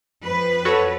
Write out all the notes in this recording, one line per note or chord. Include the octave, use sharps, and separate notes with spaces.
F2 B4
F#4 A4 C#5